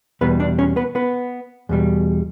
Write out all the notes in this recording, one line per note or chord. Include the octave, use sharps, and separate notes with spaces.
E2 B2 G3 B3 B4
D4 D5
C#4 C#5
B3 B4
B3 B4
E2 B2 G3